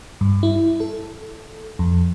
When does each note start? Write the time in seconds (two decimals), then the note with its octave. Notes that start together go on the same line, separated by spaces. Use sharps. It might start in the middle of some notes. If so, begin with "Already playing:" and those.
0.21 G2
0.43 E4
0.80 A4
1.79 F2